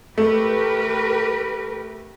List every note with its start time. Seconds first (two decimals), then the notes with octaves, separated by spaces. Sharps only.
0.18 A3 G4 A#4 B4